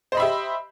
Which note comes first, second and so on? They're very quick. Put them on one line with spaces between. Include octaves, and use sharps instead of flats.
C5 D#5 B5 E5 G4